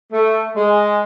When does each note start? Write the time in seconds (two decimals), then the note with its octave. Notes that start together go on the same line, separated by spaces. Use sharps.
0.13 A3
0.56 G#3